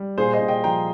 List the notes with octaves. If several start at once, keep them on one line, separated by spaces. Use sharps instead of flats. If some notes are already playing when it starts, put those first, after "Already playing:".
Already playing: G3
A#2 G#4 C5
C5 D#5
A#2
D#5 G5
F3 G5 A#5